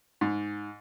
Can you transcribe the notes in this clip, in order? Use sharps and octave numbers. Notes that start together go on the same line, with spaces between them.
G#2